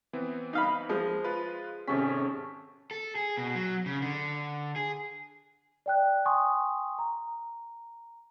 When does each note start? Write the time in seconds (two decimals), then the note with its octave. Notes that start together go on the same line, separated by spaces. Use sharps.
0.13 E3 B3 C4
0.53 D#4 F5 B5
0.89 F3 G#3
1.24 F4 B4 C6
1.88 G#1 C3 C#4 G#4 A4 B6
2.91 A4
3.15 G#4
3.37 B2
3.55 F#3
3.86 C#3
4.02 D3
4.76 G#4
5.86 D5 G5 F#6
6.25 G5 G#5 C6 C#6 D#6
6.99 A#5